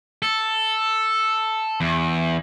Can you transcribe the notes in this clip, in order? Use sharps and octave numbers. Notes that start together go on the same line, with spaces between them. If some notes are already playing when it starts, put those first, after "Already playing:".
A4
E2